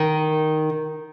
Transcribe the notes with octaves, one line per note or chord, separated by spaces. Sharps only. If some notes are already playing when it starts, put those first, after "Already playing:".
Already playing: D#3